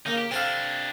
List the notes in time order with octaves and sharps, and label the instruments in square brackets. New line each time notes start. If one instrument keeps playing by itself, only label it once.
[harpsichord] C#3 A#3 [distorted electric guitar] D#4
[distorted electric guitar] G4
[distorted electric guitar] C3 D4 [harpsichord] C4 A4 F5